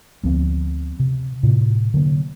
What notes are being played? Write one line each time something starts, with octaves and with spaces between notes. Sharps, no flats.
D2 F3 B3 C4
C3
A2 C3
D3 F#3 A#3